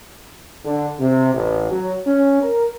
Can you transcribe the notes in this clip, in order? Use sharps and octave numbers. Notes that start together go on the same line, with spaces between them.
D3
C3
A1
F#3
C#4
A#4